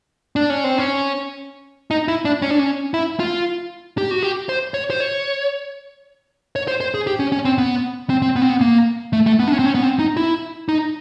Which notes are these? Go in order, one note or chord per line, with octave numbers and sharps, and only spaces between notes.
D4
C#4
C4
C#4
D#4
E4
D4
C#4
D4
C#4
E4
F4
G4
F#4
G4
C5
C#5
C5
C#5
C#5
C5
C5
G#4
G4
C#4
C#4
C4
B3
C4
C4
B3
C4
B3
A#3
A3
A3
B3
D4
C#4
C4
C#4
B3
C4
D#4
E4
D#4